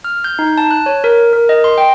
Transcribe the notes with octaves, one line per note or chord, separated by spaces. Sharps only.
F6
G6
D#4
A5
F#6
C#5
A#4
A#4
D#5
C6
G5